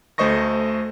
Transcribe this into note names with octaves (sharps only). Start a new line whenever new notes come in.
D2 A3 C5 D#5 C#6 A#6